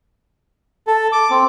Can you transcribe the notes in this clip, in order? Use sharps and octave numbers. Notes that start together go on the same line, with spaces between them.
A4
D6
C4